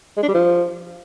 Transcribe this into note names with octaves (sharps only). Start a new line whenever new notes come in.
G#3
D4
G3
F3